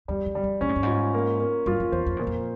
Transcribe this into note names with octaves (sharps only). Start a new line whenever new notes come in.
E2 G3
F2
G3
F2
A#2 C#4
G#2
G2
G#2 F4
A#3
A#3
G2 F4
F2
E2 C5
F2
E2 A#2
F2